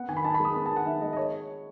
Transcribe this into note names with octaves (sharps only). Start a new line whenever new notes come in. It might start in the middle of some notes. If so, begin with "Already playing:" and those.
Already playing: B3 F#5
D#3 G#5
B5
D#4 A5
B5
G#3
D#6
B3 B5
A5
D#3
F#5
D#4 E5
G#3 D#5
D#5
C#5